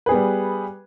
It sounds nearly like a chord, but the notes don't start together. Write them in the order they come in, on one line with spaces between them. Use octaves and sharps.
B4 G#4 B3 G3